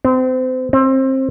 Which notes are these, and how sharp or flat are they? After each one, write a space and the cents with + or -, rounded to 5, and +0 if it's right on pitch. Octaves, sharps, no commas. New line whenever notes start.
C4 -30
C4 +25